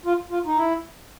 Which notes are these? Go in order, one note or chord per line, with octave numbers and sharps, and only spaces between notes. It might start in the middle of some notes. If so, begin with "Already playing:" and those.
F4
F4
D#4
E4